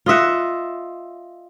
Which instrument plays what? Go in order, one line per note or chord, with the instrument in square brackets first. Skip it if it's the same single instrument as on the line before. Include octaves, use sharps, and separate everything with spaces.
[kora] F4 D#5 E5 F#5